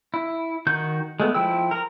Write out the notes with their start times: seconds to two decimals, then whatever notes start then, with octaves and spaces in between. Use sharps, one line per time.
0.14 E4
0.67 D#3 F#4 G6
1.20 G#3 A3 B3
1.34 F3 E4 G5 E6
1.71 A#4 A#5